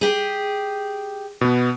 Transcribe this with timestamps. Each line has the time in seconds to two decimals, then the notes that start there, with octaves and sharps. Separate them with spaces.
0.01 G4 G#4
1.41 B2 B3